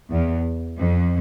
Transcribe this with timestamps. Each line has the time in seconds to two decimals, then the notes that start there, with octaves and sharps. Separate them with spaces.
0.11 E2
0.80 F2